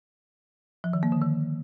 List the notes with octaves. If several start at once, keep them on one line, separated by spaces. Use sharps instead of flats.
F3
D#3
A#3
D3
D#3